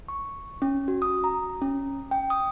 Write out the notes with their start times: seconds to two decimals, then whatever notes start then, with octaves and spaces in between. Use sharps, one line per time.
0.08 C#6
0.62 C#4
0.88 F#4
1.02 D#6
1.24 A#5
1.62 C#4
2.11 G5
2.30 D#6